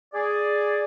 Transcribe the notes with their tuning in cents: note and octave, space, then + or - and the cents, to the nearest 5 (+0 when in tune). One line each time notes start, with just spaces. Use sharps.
G#4 +0 D5 +0